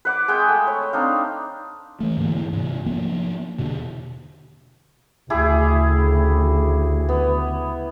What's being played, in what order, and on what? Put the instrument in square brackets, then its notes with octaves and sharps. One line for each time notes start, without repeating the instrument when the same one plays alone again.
[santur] B4 F#5 D6
G#3 G#4 F#5 G5
A3
C#5
C4 D4 D#4 F5
[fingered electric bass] E3 A3
G#2 D3 E3 A#3
G#2 C3
F3 A#3 B3
E2 B2 D3
[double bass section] D2 C#3 [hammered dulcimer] E4 G4 G#4
[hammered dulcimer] B3